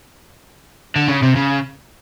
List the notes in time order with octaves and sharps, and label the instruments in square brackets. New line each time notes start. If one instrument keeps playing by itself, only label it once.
[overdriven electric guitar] D3
C#3
C3
C#3